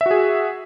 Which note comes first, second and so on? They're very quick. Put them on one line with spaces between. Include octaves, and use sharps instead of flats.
E5 F#4 G#4